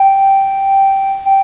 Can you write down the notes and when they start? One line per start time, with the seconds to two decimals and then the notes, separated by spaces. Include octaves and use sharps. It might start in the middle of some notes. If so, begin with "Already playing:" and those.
Already playing: G5
1.25 G5